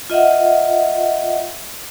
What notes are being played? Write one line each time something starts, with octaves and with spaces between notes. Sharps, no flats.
F4 D#5 E5 F#5